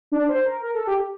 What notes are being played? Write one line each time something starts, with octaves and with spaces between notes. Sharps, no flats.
D4
C5
A#4
A#4
A4
G4